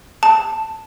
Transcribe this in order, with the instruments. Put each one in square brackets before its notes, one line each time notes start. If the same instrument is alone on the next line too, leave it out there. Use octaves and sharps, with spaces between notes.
[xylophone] A5